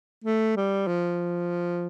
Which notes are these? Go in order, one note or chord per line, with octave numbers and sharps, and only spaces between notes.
A3
G3
F3